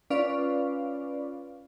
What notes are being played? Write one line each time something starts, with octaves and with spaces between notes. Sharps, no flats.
C#4 F4 B4 D5 F5